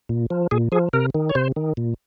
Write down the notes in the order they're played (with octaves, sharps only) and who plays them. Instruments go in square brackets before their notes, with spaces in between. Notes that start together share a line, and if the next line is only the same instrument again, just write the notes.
[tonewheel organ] A#2
F3
A#2 G#4
F3 G#4
C3 A#4
D#3
C#5
C3 C5
D#3
A#2